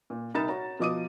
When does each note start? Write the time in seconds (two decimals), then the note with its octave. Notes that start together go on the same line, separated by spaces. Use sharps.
0.10 A#2
0.34 C2 D#4 A#4 B5 A6 E7
0.48 F#4 C#5 A#5
0.79 B2 F3 D#5 D6 D#6 D#7